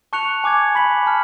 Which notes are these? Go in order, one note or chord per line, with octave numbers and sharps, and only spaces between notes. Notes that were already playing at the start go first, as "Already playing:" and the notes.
A5 C#6 F#6 C#7 F7
G#5 D6 G#6
B5 F#6 B6 F#7
A5 F6